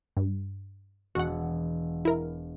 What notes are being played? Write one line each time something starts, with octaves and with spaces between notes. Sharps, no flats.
G2
E1 F#4 F#5
E4 A#4